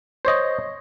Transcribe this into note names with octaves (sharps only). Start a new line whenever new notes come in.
C5 C#5 D#5